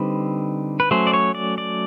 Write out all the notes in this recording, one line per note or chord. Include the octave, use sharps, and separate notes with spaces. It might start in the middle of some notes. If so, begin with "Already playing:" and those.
Already playing: D3 G3 C4 D#4 B4
B4
F#3 A3 C#4 C5
D5
C#5
D5
D5